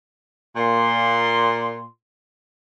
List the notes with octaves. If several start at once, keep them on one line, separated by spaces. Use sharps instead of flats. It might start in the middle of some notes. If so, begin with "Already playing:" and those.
A#2 C6